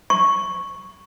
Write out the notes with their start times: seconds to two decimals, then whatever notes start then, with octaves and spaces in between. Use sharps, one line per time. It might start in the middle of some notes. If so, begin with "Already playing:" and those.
0.10 C#6